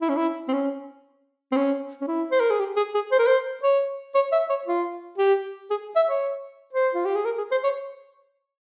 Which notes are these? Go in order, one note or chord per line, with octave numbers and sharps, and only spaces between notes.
E4
C#4
E4
C4
C#4
C4
C#4
C#4
E4
C5
A#4
G#4
G4
G#4
G#4
C5
A#4
C5
C#5
C#5
E5
C#5
F4
G4
G#4
E5
C#5
C5
F4
G4
G#4
A#4
G#4
C5
C#5